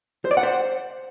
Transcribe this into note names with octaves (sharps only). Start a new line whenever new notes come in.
C5
D5
F#5
C5